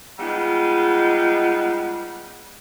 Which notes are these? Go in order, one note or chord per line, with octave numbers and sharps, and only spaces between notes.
G3 G#3 B3 D#4 F4